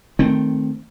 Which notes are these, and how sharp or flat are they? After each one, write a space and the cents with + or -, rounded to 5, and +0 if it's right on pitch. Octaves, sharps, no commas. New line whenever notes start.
D#3 +0 A3 +0 C4 +0